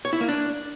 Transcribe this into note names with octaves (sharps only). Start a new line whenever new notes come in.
C#5
E4
A#3
D4